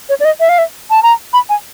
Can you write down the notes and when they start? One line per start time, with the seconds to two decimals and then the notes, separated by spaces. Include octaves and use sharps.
0.09 C#5
0.20 D5
0.25 D#5
0.40 E5
0.49 F5
0.58 E5
0.90 A5
1.03 A#5
1.33 B5
1.49 G#5